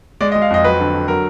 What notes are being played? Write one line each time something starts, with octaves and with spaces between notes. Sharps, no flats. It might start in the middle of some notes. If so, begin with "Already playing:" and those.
G#3 D5
D#5
G#3
F5
F2 D#5
F#3 B4
D3
D3
F#3 A#4